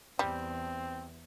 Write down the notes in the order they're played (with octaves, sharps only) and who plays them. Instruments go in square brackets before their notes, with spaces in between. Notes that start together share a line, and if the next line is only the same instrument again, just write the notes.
[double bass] E2 [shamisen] G3 [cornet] C4